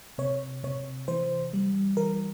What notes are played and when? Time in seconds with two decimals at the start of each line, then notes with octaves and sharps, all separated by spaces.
0.18 C3 C#5
0.64 C3 C#5
1.08 E3 C5
1.53 G3
1.97 E3 A#4